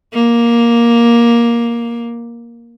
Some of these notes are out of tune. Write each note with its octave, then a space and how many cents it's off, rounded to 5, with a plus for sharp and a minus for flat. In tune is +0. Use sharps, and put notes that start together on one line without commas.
A#3 +10